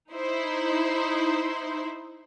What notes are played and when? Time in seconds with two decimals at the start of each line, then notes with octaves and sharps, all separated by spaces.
0.11 D#4 E4 C5